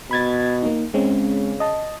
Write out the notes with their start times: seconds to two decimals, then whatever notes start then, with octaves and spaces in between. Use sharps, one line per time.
0.11 B2 B5 G#6 A6
0.62 A#3 D#4
0.94 C#3 G#3 C4 C#4
1.60 D#5 A5